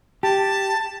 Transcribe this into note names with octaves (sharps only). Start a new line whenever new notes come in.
G4 A5